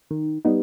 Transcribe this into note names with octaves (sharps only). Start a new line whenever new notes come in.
D#3
G3 B3 D#4